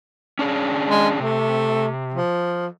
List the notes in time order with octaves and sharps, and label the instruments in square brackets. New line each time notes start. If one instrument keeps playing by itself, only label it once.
[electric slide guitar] C#4 D4 G#4
[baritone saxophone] G#3
[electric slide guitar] C3 [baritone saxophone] A3
[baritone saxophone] F3